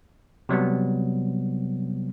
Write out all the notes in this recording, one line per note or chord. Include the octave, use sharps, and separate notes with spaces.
C3 F#3 G3 B3